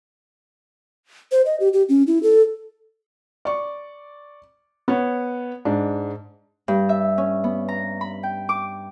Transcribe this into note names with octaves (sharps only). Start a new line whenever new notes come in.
C5
D#5
G4
G4
C#4
E4
A4
D5 C#6
B3 C#5
G#2 D4
G2
E5
C#4
B3
A#5
B5
G5
D6